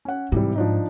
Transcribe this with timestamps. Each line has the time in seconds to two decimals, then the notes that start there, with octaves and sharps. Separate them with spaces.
0.05 C#4 F#5
0.32 G#2 C3 E3 G3
0.56 F3 D4 D#4